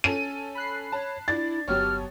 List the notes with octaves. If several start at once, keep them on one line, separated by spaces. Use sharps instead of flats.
C#4 A4 D#7
B5 F#6 C7
C#5 A5
D4 E4 A6
G1 F#3 B3 G4 C#5 A5 F6